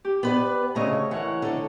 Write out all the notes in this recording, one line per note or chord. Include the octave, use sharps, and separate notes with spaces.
G4
B3 B4 D5
D2 C#3 A3 C#5 D#5 A#5
E3 A#4 C#5 F#5
D3 A4